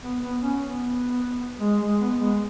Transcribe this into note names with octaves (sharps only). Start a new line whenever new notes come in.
B3
B3
C#4
B3
G#3
G#3
B3
G#3